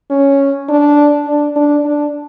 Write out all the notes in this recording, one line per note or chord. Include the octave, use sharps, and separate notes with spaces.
C#4
D4
D4
D4
D4